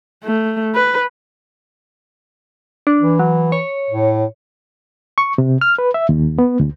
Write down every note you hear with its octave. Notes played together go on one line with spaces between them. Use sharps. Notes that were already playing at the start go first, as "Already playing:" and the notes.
A3
B4
D4
E3
F#3
C#5
A2
C#6
C3
F6
B4
E5
D#2
B3
D2